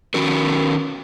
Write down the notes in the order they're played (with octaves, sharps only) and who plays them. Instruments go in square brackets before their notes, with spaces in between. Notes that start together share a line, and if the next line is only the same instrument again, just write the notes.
[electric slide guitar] D#3 C#4 F#4 A#4